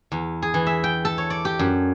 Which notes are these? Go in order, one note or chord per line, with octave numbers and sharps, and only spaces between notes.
E2
G#4
E3
E5
G5
A4
C#5
D5
G4
F#2